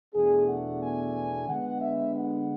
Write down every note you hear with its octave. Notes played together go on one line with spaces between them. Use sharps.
E2 B2 A3 D4 G#4
F#5
G#5
D3 G#3 B3 F#5
E5
F#5